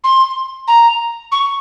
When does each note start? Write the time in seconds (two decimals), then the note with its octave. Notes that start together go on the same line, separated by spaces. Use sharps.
0.04 C6
0.68 A#5
1.32 C#6